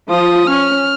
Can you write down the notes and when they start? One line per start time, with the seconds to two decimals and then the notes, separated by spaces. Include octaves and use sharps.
0.10 F3 F4 D#6
0.47 C#4 F6